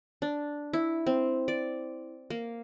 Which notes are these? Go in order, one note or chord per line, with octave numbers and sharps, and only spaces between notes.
D4
E4
C4
D5
A#3